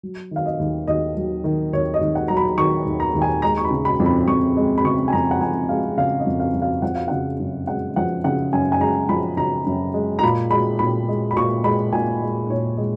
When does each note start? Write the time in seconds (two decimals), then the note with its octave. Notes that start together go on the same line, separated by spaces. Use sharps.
0.03 F#3
0.31 D#3 F5
0.46 D#5
0.59 D#2
0.87 D#2 D#5
1.17 F#3
1.44 D#3
1.73 D#2 C#5
1.94 D#5
2.01 D#2
2.15 F#5
2.28 F#3 A#5
2.37 B5
2.58 D#3 C#6
2.86 D#2
3.00 A#5
3.15 D#2
3.22 G#5
3.42 G#3 A#5
3.58 C#6
3.65 B5
3.71 C#3
3.85 B5
4.00 F2
4.06 B5
4.28 F2 C#6
4.57 G#3
4.78 B5
4.84 C#3 C#6
5.08 G#5
5.13 F2 A#5
5.31 F#5
5.41 F2 G#5
5.69 G#3 F5
5.98 C#3 F5
6.19 D#5
6.27 F2
6.40 F5
6.54 F2
6.62 F5
6.82 F3 F#5
6.95 F5
7.08 C#3 F#5
7.40 F#2
7.67 G#3 F#5
7.96 F3 F#5
8.24 C#3 F#5
8.53 F#2 G#5
8.72 G#5
8.81 G#3 A#5
9.09 F3 B5
9.37 C#3 A#5
9.66 F#2
9.94 G#3
10.19 A#5
10.23 A#2 B5
10.51 G#3 B5
10.79 A#2 B5
11.09 G#3
11.31 B5
11.36 A#2 C#6
11.64 G#3 B5
11.93 A#2 G#5
12.22 G#3
12.49 A#2 C#5
12.78 G#3